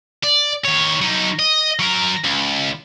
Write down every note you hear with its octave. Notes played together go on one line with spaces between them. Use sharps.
D5
D#3 C#5
F#3 D#4
D#5
F#3 A#4
C#2